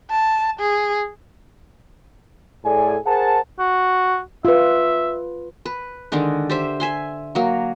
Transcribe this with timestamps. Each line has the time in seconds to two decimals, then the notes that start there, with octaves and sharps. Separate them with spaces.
0.11 A5
0.59 G#4
2.65 A2 G#4 A4 D5 G#5
3.06 G#4 A#4 C5 F#5 A5
3.59 F#4
4.45 F4 B4 E5
5.66 B4
6.12 D3 D#3 G#3 D4
6.50 G4 C5 E5
6.80 E5 G#5 C6
7.35 F#3 A#3